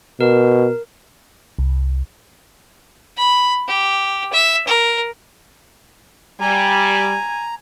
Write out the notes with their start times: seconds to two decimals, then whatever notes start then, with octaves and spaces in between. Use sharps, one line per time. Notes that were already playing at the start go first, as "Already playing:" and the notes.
0.21 B2 A#4
1.59 C2
3.17 B5
3.68 G4
4.32 E5
4.67 A#4
6.41 G3 G#5 A#5